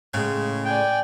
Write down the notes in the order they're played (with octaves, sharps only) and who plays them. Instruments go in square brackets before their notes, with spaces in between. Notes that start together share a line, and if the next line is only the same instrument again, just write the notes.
[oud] A2 G#3 [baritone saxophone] C#3
[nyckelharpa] D5 G#5 [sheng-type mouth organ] G5